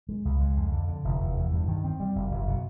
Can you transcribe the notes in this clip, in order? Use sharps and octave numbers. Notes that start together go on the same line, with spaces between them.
G#3
C#2
G#3
F2
D3
D3
F1
E2
E2
G2
D#3
C4
G3
F#1
F#1
B2